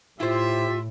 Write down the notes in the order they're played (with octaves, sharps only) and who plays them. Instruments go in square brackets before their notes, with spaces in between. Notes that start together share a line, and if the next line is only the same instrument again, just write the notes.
[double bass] A2 [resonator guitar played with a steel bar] E4 C5 [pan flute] F4 [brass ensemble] G4 E5